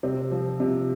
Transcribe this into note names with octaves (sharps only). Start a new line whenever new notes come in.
C3 C4
F3
C3